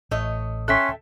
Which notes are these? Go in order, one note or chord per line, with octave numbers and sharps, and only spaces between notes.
A1 A3 C#5 D#5
C#4 A4 E5 G5 C6 F#6 B6